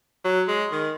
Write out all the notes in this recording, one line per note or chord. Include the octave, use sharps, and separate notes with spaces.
F#3
G#3
D#3